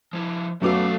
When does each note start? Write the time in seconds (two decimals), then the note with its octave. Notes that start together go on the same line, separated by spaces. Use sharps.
0.13 F3 E4
0.62 B1 F#2 F#3 A3 B3 F#4 F5 D6